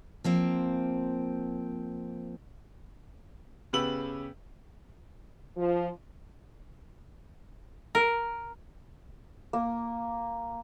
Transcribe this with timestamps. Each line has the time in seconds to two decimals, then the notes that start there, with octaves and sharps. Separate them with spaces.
0.24 F3 A#3 C4
3.73 C#3 B3 G4 B4 E6 F#7
5.56 F3
7.95 A#4
9.53 A#3